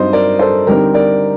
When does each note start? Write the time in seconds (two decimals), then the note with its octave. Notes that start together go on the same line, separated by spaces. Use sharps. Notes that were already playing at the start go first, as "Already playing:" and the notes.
Already playing: G2 F#3 C4 D#4 C5 D#5
0.13 A#4 D5
0.39 A4 C5
0.67 D3 G3 C4 D#4 G4 A#4
0.94 A#4 D5